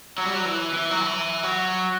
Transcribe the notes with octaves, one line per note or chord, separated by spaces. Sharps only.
F#3
G3
F#3
E3
E3
F#3
E3
F#3